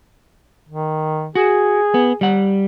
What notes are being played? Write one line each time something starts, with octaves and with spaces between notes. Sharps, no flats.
D#3
F#4 G#4
B3
G3 F#5